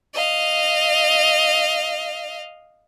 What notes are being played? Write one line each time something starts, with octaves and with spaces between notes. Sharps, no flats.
D#5 F5